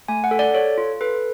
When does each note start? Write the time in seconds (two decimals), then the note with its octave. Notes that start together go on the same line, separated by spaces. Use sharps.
0.08 A3 G#5
0.24 F#5
0.31 A4
0.39 D5
0.54 A4 C#5
0.78 F4
1.01 A4 B4